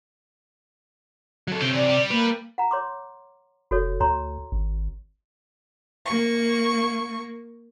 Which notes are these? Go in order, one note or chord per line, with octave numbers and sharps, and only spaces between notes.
F#3 A4
C3 C#5 G5
E3 F#3 D5
G3 G4
A#3 B4
F#5 A#5
C#5 C6 D6
F1 F#4 A4 C#5
D2 C#5 A#5 C6
G#1
A#3 C#6